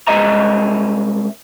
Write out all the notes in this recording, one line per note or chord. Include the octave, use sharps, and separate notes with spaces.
C2 G#3 D#5 E5 A#5